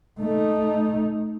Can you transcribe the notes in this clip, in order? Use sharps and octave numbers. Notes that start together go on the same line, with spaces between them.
A3 D#4